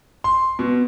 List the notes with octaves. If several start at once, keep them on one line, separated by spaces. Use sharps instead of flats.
C6
B2